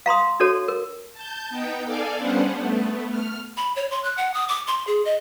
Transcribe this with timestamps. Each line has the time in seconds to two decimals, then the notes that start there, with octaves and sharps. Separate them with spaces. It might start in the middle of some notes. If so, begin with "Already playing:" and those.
0.06 F5 A#5 C6 D#6
0.40 D4 F#4 A4 C#5
0.68 A#4
1.13 A5 G6
1.49 B3 D#4 G5
1.84 A4 D5 F5 G#5
2.18 G3 B3 C#4 D4 C5 F#5
2.51 A3 B3
3.10 F6
3.57 B5
3.76 C#5
3.91 C6
4.04 F#6
4.18 F#5
4.34 D#6
4.49 D6
4.67 C6
4.87 G#4
5.05 D#5